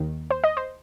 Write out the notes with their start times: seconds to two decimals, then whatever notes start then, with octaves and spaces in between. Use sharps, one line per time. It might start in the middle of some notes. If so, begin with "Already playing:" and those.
Already playing: D#2 D#3
0.31 C5
0.44 D#5
0.57 C5